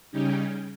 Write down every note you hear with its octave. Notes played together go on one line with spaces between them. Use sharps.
C#3 G3 C#4 D#4 G4